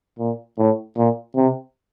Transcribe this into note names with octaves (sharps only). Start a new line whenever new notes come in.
A#2
A2
A#2
C3